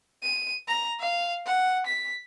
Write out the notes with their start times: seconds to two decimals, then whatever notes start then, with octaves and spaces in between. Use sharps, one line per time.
0.23 D#7
0.68 A#5
1.00 F5
1.46 F#5
1.86 B6